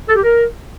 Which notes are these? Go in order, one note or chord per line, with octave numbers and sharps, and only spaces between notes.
A4
G4
A#4